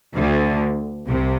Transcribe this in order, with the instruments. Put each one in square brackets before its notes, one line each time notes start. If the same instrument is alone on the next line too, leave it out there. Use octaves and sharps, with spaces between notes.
[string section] D2 D3
C2 C3